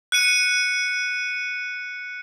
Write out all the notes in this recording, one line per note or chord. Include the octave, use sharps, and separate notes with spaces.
F#6 C#7 D#7